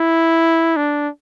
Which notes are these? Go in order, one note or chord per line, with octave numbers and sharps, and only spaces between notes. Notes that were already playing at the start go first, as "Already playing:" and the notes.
Already playing: E4
D4